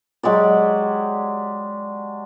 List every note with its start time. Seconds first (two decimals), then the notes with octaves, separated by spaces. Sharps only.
0.23 F#3 G#3 G4 D5